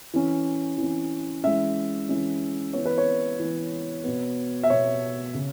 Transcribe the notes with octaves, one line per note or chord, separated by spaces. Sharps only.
E3 C#4
E3
C#4
E3 G#3 C#4 E5
E3 G#3 C#4
E3 B3 C#5
B4
C#5
E3 B3
B2 B3
E5
B2 B3 C#5
C#3